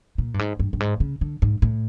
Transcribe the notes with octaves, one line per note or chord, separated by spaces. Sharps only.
A#2
G2
G#2
G2
G2
G#2
C#3
D3
G#2
A2